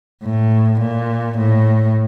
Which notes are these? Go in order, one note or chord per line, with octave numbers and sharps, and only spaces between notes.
A2
A#2
A2